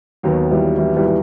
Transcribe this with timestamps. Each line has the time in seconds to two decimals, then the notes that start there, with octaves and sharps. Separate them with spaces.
0.23 D#2 D#3 F#3 B3
0.51 E3 G3
0.78 E3 G3
0.96 E3 G3
1.07 G3